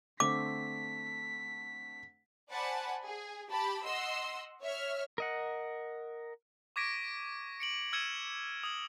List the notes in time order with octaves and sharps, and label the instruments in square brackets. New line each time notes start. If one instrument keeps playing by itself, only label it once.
[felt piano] D3 A3 C4 [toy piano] D6 [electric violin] B6
[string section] C5 D5 F#5 G#5 A5 B5
G#4
G4 A5 B5
D#5 F#5 C6 E6
C#5 E5 F6
[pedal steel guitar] A#4 D#5 F#5
[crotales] C#6 D6 G#6 A#6 B6 D7
C#7 D7 F#7
E6 F6 G#6 C#7 D#7 E7
D#6 F#7